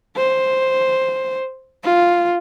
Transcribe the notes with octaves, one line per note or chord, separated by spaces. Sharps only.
C5
F4